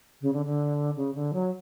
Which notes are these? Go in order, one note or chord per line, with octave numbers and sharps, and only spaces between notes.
C#3
D3
D3
C#3
D3
F#3